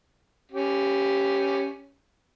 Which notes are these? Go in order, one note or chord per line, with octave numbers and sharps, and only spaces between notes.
C#4 G4